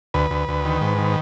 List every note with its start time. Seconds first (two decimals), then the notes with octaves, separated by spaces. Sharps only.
0.14 D2 B4
0.31 D2
0.49 D2
0.65 D#3
0.81 G#2
0.98 D#3